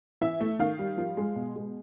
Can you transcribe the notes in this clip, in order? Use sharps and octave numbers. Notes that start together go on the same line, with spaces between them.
E3 E5
A3
D#3 F5
G3
F3
G#3
B2
G#3